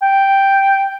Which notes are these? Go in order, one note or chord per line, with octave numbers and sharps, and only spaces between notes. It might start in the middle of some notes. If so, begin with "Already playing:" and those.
G5